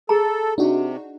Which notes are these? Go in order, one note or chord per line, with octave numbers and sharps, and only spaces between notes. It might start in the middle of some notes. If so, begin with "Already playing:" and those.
G#4 A4 A#5
C3 D4 D#4 F#4